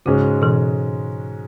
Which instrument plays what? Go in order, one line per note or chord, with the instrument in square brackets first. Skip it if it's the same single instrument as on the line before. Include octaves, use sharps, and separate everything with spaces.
[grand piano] G#2 G#3 C#4 F#4 [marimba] C#3
[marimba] B2 E3